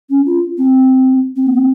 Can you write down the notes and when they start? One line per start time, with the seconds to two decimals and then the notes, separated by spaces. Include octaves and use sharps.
0.10 C#4
0.26 F4
0.58 C4
1.36 C4
1.47 A#3
1.57 C4